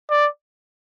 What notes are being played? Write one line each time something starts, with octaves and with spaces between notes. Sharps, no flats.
D5